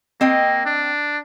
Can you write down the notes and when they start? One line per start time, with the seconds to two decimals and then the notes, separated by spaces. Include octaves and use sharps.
0.21 A#3 C4 D#5 G5
0.66 D4